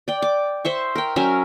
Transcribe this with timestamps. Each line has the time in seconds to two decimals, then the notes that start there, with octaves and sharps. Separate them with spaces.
0.08 D5 G5
0.22 D6
0.65 C5 E5 C#6
0.96 A#4 G5
1.16 F#3 C#4 A#4 E5